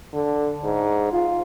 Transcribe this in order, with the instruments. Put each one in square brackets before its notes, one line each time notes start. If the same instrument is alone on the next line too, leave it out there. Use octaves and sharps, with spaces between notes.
[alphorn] D3
G#2
F4